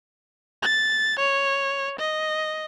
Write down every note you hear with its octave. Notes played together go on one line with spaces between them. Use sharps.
A6
C#5
D#5